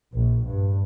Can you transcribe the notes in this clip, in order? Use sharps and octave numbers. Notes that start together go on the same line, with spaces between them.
A#1
G2